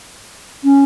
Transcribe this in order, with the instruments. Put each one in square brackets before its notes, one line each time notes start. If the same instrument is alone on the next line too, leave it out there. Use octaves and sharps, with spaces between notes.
[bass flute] C#4